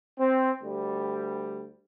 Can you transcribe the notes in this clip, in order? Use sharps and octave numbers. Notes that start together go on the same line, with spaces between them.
C4
D2 G3